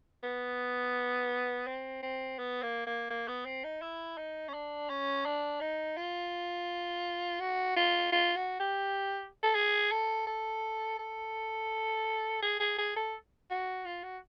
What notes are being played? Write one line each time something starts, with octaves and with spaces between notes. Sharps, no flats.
B3
C4
C4
B3
A#3
A#3
A#3
B3
C4
D#4
E4
D#4
C#4
D4
C#4
D4
D#4
F4
F#4
F4
F4
F#4
G4
A4
G#4
A4
A4
A4
G#4
G#4
G#4
A4
F#4
F4
F#4